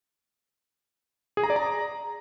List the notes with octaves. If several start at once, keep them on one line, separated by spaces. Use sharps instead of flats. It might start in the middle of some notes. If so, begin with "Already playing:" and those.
G#4
A#5
D5
A#5